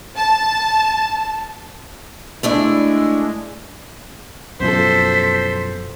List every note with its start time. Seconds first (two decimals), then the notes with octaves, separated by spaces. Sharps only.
0.16 A5
2.43 G#3 A3 D4 E4 D5
4.60 F#2 B2 F3 A4 C5 B6